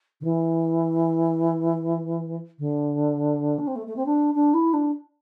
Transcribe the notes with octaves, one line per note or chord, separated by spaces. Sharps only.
D3
E3
D3
D4
C4
A3
A3
C4
D4
D4
E4
D4